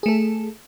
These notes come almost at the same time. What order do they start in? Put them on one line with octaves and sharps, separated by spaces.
G#4 A3 A4